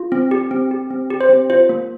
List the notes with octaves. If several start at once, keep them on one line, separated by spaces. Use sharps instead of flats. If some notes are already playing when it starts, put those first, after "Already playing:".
Already playing: F4
C4
G4
C4
G4
C4
G4
C5
C4
F4 C5
A#3